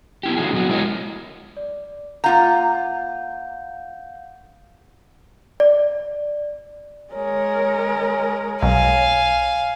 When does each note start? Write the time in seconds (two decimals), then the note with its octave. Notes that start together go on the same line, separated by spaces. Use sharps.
0.23 B3 E4 G4
0.37 D3 F3 C4 F#4 G#4
0.52 A#2 F#3 B3 F#4
0.69 G#3 E4 A#4 B4 C#5 D#5
1.57 D5
2.24 A#3 F4 F5 F#5 A#5 G6
5.60 D5
7.13 G#3 A#4 C#5
8.62 B1 F5 G#5